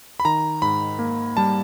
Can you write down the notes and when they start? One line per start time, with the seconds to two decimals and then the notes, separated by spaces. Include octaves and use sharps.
0.20 B5
0.25 D#3 A#5
0.62 G#2 B5
0.99 A#3
1.37 G3 A5